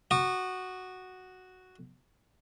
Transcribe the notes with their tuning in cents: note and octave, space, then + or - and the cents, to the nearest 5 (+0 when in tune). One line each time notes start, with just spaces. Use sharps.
F#4 +0 D#6 -35